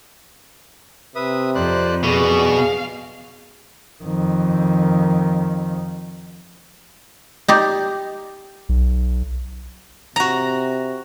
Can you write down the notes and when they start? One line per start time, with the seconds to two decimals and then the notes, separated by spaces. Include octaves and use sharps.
1.16 C3 B4 E5 D#6
1.55 F2 C5 D5 F#6
2.03 B2 G#4 D5 C#6
2.52 F5
4.03 F2 D#3
7.48 D#4 G4 D5
8.69 B1
10.16 C3 F#4 A#5